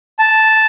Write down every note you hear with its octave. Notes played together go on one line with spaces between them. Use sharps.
A5